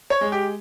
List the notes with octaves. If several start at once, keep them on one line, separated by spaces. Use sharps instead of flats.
C#5
G#3
G4